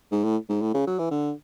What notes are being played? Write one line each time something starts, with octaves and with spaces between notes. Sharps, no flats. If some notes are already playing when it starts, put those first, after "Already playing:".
G#2
A2
G#2
A2
C#3
F#3
E3
D3